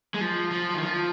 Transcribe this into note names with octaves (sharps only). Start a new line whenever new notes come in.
G#3
F3
F3
D#3
F3